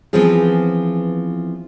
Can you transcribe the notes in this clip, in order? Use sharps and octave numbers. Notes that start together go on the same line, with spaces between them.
E3 F3 B3 C4 F4 G#4